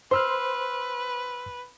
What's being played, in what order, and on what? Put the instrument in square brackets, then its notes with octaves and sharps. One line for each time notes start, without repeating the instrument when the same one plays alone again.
[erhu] B4 [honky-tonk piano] C5 [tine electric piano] C6 E6 F6